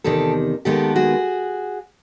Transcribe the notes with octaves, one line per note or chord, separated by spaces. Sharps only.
E2 C3 D#3 G4 A4
D#2 D#3 G#3 B3 G4 A4
F#4 G#4